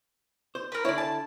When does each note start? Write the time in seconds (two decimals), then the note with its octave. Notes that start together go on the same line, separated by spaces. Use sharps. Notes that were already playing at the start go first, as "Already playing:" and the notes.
0.55 C5
0.72 A#4 B4
0.85 D3 E4 C#5 D5
0.98 A5